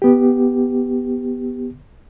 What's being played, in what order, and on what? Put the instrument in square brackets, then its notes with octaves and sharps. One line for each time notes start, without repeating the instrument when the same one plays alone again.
[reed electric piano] B3 G4